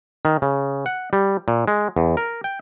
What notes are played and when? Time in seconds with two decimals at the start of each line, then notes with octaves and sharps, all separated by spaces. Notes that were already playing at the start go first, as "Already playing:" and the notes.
0.25 D#3
0.42 C#3
0.86 F#5
1.13 G3
1.48 A#2
1.68 G#3
1.97 E2
2.17 A#4
2.44 G5